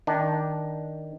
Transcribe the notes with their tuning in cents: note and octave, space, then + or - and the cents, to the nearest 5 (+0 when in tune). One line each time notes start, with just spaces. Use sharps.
D#3 +0 D4 +0